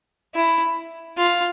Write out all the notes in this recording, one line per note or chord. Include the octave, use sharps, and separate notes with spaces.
E4
F4